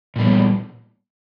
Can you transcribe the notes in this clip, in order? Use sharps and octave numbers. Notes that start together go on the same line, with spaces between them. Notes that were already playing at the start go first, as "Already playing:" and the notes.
A#2 G3 B3